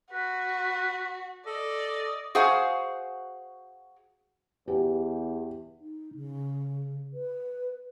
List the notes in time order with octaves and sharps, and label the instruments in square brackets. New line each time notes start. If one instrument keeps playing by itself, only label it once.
[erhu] F#4 [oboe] B4
[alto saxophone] A4 [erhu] D5 [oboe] D#5
[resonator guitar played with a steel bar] F#4 G#4 C5 F5 F#5 G#5
[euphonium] E2 [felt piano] G4
[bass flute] D#4
C#3
B4